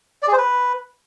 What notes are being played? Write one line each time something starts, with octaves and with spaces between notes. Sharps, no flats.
D5
G#4
C5
B4